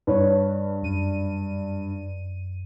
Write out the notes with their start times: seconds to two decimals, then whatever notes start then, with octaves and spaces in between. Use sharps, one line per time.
0.07 G2 B4 C#5
0.82 F#2 D#7